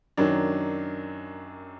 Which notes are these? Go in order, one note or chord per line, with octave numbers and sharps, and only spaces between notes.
F#2 D#3 F#3 D4